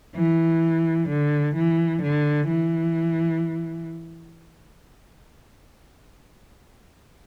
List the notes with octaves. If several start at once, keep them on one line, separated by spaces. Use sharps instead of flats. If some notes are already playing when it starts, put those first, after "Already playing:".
E3
D3
E3
D3
E3